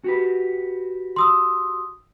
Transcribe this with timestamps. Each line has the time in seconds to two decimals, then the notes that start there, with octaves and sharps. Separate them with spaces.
0.04 F#4 G4 B4
1.16 C6 D#6 E6